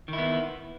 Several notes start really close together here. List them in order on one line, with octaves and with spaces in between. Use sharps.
D#3 E4 B3